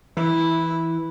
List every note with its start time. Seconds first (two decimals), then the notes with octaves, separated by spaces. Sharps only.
0.17 E3 E4